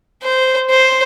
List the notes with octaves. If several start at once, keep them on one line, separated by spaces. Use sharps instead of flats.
C5
C5